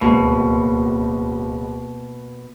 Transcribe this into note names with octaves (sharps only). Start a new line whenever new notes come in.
D1 C#2 B2 A#3